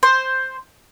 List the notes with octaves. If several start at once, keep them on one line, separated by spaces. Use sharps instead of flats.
C5